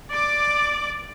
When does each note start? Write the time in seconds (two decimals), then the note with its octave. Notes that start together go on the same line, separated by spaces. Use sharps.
0.10 D5 D6